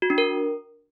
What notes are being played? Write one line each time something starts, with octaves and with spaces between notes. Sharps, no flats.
F#4
D4
A#4